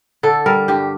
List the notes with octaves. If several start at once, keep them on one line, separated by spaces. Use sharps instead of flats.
D3 A4
G3 A#4
G2 G4